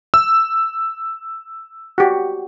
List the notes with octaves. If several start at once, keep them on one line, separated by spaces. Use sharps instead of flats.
E6
F#4 G4